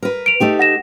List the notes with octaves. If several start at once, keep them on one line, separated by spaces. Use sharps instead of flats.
A#4 B4
D7 F7
A3 D#4 G4
F#5 A#6 E7